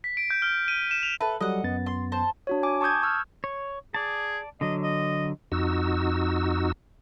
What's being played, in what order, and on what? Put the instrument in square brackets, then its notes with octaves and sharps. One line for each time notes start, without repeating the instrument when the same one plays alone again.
[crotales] B6
D7
G6
F6
D#7
E7
F7
[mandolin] A4 B4 [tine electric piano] E5
[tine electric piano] F#3 G3 A4 [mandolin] D#5 F#5
[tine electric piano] F#2 B3 A6
[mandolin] C6
C5 A5
[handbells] D4 F#4 C#5
G#5 D6
A5 C#6 D#6 G6 G#6
C#6 E6 F6
[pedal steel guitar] C#5
[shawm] G#4 [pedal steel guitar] D5 A5
[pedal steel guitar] D3 F#3 [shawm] D#5
[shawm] D#5
[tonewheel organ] F2 D#4 F#4 E6